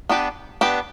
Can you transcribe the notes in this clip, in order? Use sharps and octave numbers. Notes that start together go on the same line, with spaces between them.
B3 D4 G4 B4
B3 D4 G4 B4